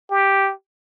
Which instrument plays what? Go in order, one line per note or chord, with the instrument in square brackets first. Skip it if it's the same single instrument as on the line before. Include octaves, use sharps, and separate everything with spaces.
[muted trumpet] G4